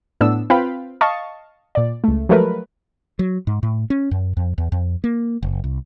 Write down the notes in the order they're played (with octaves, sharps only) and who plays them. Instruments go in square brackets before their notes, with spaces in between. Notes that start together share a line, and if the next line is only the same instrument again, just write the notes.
[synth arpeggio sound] A2 B3 D4 E6
C4 F4 B4 F5 G5 B5
D#5 F5 A5 C#6
A#2 D5
C#2 A3
F3 F#3 G#3 A3 A#4 B4
[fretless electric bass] F#3
G#2
A2
C#4
F#2
F2
E2
F2
A#3
F#1
C2